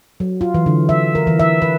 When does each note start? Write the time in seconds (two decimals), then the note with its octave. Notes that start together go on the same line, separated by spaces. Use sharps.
0.20 F#3
0.41 F4
0.54 E3
0.66 D3
0.89 E5
1.15 A#4
1.27 E3
1.40 E5
1.62 B4